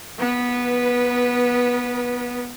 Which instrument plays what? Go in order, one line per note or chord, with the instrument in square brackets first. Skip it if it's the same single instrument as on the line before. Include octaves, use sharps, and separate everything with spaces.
[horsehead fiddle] B3 B4